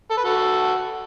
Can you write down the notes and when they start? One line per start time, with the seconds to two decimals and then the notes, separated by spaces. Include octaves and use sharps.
0.10 A4
0.17 B4
0.24 F#4 A4